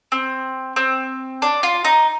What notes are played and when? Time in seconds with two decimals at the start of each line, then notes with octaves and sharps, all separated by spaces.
0.12 C4
0.76 C4
1.42 D4
1.63 F4
1.85 D#4